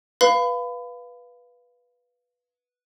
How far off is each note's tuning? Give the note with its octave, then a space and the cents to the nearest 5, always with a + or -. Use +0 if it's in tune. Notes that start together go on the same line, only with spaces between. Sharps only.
B4 -10 F5 +0 B5 +30